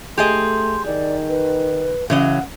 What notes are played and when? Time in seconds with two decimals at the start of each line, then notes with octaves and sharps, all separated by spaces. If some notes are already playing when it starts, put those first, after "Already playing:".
0.17 A3 G4 G#4 D#5 C6
0.85 D#3 D5
1.29 B4
2.10 C#3 E3 F#3 D#5 F#5